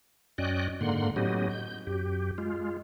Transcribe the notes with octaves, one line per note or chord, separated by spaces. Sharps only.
F#2 C#4 D5 D#5 G5 F#6
G#2 D3 A#3 F#5 C6
A2 F#3 B3 C#4 G4 D#5
G6
F#2 G4
G#3 F4